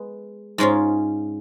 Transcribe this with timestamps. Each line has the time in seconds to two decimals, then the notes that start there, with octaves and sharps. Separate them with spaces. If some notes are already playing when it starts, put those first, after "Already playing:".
Already playing: G#3 B3 B4
0.58 G#2 G#3 C#4 F4